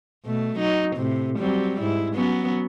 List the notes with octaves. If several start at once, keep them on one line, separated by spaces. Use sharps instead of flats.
B2 A3
F#3 D#4
A2 C3
F#3 G3 C4
G#2 E4
F#3 B3 C#4